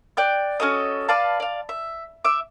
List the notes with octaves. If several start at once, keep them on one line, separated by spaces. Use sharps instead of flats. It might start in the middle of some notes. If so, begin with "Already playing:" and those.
D5 G5 F#6
C#4 F#4 A4 D#5
B4 D5 F5 A5
D5 F5
E5
E5 D6